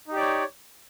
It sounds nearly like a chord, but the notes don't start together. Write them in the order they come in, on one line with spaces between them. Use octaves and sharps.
D#4 G4 D5 C#5